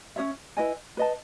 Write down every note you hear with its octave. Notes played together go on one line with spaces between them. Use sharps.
C#4 G#4 C#5 E5
E4 B4 D#5 G#5
B4 D#5 A5